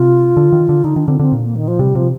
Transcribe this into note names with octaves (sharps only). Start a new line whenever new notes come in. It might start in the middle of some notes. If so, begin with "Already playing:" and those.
Already playing: C3 F4
D3
D#3
D3
D3 D#4
D#3 D4
D3 C4
D3 C4
A#2
A#3
D#3
F3
C3 G3
C3 F3